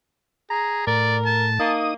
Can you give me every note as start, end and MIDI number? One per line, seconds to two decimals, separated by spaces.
0.50 0.85 68
0.50 0.82 82
0.87 1.59 45
0.87 1.48 70
0.87 1.17 74
1.26 1.73 81
1.60 1.93 58
1.60 1.94 63
1.60 1.94 87